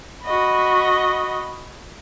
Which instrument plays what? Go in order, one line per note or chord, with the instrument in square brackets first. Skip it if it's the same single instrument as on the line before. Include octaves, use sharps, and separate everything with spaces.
[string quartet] F#4 D#5 B5